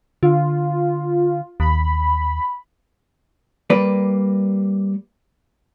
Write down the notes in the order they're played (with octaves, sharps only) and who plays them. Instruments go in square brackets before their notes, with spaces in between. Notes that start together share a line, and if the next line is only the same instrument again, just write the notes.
[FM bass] D3 [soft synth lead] F4
[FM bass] D#2 [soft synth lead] B5
[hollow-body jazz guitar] G3 A#3 B4 D5